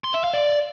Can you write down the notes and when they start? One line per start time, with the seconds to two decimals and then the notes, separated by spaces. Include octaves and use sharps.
0.04 C6
0.14 E5
0.24 F5
0.34 D5